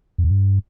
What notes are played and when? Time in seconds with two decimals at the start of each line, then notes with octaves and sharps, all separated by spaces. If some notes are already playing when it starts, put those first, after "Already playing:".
0.18 F2
0.24 E2
0.31 G2